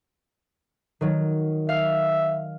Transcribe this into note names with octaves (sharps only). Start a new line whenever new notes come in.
D#3 F#3
E5 F5